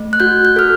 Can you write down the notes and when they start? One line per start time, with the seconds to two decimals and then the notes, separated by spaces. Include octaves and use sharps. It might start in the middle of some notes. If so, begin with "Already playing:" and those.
Already playing: A3
0.13 F#6
0.20 F#4 G6
0.45 G6
0.56 A4 F6